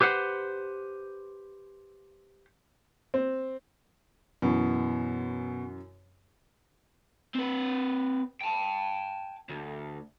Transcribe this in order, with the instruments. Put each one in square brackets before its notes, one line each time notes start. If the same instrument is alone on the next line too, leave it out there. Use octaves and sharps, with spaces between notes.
[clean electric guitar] G4 B4 C5 F#5
[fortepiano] C4
[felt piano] F#2 E3 [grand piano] B2
[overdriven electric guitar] C4 B4
G5 A5
D2